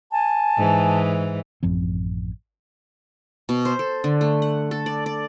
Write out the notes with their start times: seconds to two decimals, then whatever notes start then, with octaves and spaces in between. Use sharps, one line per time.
0.12 G#5 A5
0.57 G#2 E3
1.63 A1 F#2 F3 C4
3.49 B2
3.65 C5
3.79 A4
4.04 D3
4.21 A3
4.42 F#5
4.71 A4
4.86 D5
5.06 D5